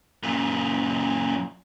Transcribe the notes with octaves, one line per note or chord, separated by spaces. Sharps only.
F#2 A#2